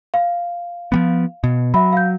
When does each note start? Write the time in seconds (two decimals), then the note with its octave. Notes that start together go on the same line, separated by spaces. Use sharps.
0.14 F5
0.92 F3 G3 B3
1.44 B2
1.74 F#3 E5 B5
1.93 F5 G6